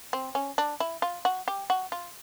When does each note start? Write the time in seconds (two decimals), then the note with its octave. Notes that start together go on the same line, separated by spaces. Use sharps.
0.13 C4
0.35 C#4
0.58 D4
0.80 E4
1.02 F4
1.25 F#4
1.48 G4
1.70 F#4
1.92 F4